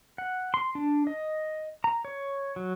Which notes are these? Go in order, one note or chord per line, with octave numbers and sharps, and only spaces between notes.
F#5
C6
D4
D#5
A#5
C#5
F#3